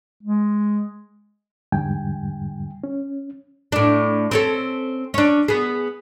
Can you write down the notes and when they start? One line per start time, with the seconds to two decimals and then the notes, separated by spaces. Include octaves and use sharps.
0.23 G#3
1.72 E2 G#2 D3 G3 G5 G#5
2.84 C#4
3.72 A2 D4
4.31 C4 C#4 A4
5.14 C#4 D4
5.48 B3 G#4